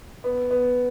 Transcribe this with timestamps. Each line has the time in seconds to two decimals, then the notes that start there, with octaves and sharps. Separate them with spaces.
0.24 B3
0.51 B3